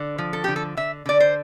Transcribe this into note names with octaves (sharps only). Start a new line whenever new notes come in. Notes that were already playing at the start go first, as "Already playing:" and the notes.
Already playing: D3
F3
A4
D3 G4
A4
D3 E5
D3 D5
C5